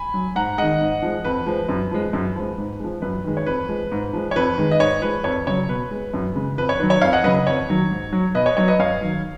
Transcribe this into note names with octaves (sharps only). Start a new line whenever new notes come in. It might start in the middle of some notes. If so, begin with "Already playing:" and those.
Already playing: G#5 B5
F#3
G#2 F#5 A#5
D#3 G#3 D#5 F#5
G#2
F3 G#3
F2 B4
F3 G#3
F#2
F3 G#3
F#2
F3 G#3
G#2
F3 G#3
F#2 B4
D#3 G#3
C#5
F2 B4
F3 G#3
G#2
F3 G#3
C#5
F2 B4
D#3 G#3
D#5
G#2 C#5
F3 G#3 B4
F2 C#5
C#3 F#3 C#5
B2 B4
G#3
F#2
C#3 G#3
F2 B4
C#5
D#3 F#3 B4
C#5
F2 C#5 F5
D#5 F#5
C#3 F#3 B4 D#5
B4
F2 C#5
D#3 F#3
G#2
F#3
B2 B4 D#5
C#5
F#3 C#5
B4 D#5
F#2 C#5 F5
D#3 F#3